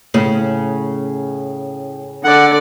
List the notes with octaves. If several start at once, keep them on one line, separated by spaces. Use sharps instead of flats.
A2 C#3
D3 D5 F#5